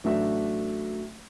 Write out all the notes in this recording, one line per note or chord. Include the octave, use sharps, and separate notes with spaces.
A1 F#3 A3 D4 E5